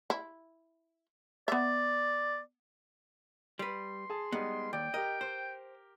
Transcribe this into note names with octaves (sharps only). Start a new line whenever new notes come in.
E4
B3 D5 E5
G3 B4 C6
G#4 A5
G3 G#3 B3 D#4
D#2 D5 G5
G4 A#4 D#5
C5